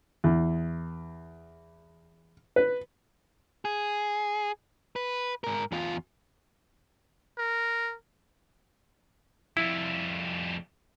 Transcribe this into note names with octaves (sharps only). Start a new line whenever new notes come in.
E2
B4
G#4
B4
G#2 A#4
E2 F4
A#4
F2 G3 E4